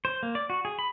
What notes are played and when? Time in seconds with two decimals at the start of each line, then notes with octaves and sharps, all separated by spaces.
0.05 C5
0.23 A#3
0.35 D5
0.50 F#4
0.65 G#4
0.79 B5